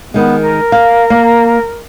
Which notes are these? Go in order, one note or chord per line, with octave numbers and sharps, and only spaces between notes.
D#3 G#3 B3
A#4
F5
A#3